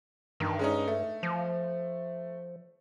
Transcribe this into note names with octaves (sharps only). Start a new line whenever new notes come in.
G2 D#3
G#3 C#4 D#4
A3
F3